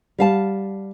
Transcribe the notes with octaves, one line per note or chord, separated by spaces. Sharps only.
G3 F5 A5